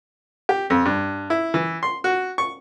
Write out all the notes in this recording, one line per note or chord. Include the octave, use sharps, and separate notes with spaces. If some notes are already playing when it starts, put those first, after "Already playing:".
G4
F2
G2
E4
E3
C6
F#4
C#6